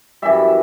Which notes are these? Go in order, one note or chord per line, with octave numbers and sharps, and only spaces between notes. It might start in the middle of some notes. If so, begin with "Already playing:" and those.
F#2 E3 G3 E5